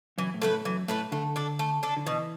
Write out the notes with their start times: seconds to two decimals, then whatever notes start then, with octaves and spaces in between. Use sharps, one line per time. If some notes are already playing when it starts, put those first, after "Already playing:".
0.18 F#2 E3
0.34 A2
0.42 F#2 A3 E4 B4
0.49 A2
0.65 F#2 E3
0.88 A2 A3 E4 B4
1.12 D3 A3
1.36 D4 A4
1.59 A3
1.83 D4 A4
1.97 D3
2.06 B2 E3